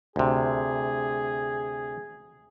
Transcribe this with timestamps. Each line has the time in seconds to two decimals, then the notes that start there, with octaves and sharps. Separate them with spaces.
0.16 D2 C3 G#4